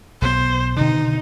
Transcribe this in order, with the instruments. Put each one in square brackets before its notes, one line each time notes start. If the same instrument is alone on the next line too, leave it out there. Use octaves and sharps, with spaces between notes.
[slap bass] B1 B3 [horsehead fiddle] C5
[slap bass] B2 D3 D#3 [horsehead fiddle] D#4